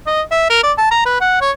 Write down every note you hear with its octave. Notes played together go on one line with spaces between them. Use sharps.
D#5
E5
A#4
D5
A5
A#5
B4
F#5
C#5